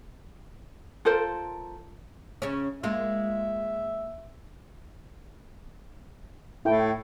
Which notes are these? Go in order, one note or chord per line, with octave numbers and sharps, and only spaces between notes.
F4 A4 A#4 C5
C#3 C#4
G#3 A#3 F4 E5
A2 E4 A4 G5